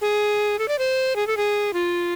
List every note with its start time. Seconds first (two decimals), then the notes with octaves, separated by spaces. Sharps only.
0.01 G#4
0.59 A4
0.68 D5
0.79 C5
1.16 G#4
1.27 A4
1.37 G#4
1.73 F4